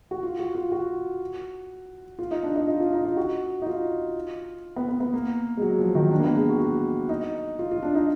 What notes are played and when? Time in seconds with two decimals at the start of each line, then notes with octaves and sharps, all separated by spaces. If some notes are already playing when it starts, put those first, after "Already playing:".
0.11 F#4
0.23 F4
0.39 F#4
0.55 F4
0.72 F#4
2.19 F4
2.31 D#4
2.43 D4
2.56 D#4
2.67 F4
2.80 F4
2.93 D#4
3.05 F4
3.17 F#4
3.62 D#4
3.67 F4
4.76 B3
4.89 B3
5.00 B3
5.13 A#3
5.57 G#3
5.62 F#3
5.79 F3
5.95 D#3
6.11 D4
6.20 A#3
6.24 B3
6.36 G#3
6.49 F#4
6.60 F#4
7.09 D#4
7.59 F4
7.71 F4
7.83 D4
7.95 D#4